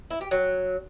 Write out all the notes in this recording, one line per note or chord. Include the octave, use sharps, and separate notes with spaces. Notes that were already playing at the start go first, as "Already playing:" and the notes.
E4
G4
F#3